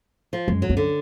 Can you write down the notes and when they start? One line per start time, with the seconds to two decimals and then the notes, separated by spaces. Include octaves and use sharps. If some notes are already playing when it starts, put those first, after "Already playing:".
0.33 F3
0.48 F#2 G#3
0.62 F#3
0.69 F#2
0.77 D3